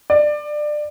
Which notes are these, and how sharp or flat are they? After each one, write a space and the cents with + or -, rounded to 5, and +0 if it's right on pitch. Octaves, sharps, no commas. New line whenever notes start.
D5 +20